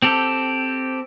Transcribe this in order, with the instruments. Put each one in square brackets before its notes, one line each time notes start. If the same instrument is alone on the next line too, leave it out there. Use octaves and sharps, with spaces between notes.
[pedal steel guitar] C4 G4 A4